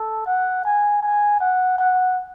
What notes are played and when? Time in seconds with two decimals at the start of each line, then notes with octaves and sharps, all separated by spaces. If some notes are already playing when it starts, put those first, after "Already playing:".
Already playing: A4
0.26 F#5
0.65 G#5
1.02 G#5
1.40 F#5
1.78 F#5